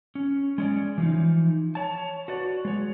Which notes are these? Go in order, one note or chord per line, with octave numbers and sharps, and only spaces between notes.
C#4
G#3 C#4 D5
E3 F3 D#4
C#5 A5
F#4 B4 D5
G#3 C#5